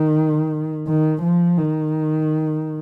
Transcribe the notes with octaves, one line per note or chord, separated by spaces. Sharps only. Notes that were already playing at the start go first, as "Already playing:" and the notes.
Already playing: D#3
D#3
F3
D#3